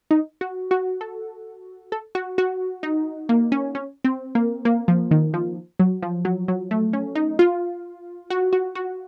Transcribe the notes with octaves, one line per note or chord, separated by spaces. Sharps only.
D#4
F#4
F#4
A4
A4
F#4
F#4
D#4
A#3
C#4
C#4
C4
A#3
A#3
F3
D#3
F3
F#3
F3
F#3
F#3
A3
C#4
D#4
F4
F#4
F#4
F#4